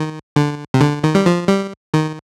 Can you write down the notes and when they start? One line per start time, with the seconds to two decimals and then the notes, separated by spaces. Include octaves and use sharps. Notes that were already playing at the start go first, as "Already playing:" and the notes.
Already playing: D#3
0.36 D3
0.74 C3
0.81 D3
1.04 D#3
1.15 G3
1.26 F3
1.48 G3
1.94 D#3